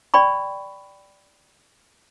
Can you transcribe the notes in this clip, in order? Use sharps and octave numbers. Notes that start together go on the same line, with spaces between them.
D5 G5 B5 C#6